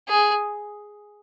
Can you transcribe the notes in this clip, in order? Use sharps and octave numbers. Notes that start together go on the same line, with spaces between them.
G#4